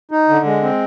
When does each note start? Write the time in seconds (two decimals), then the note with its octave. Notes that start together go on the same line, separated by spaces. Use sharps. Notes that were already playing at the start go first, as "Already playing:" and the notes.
0.11 D#4
0.29 D3
0.45 G#3
0.63 C4